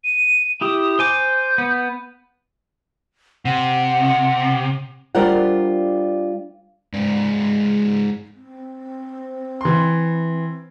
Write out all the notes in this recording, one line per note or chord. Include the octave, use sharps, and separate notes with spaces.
D#7
E4 G4 D#6
C5 G#5 D6 G6
B3
C3 F#5
G3 D4 F4 A#4 C5 F#5
G#2 D5
C4
E3 C6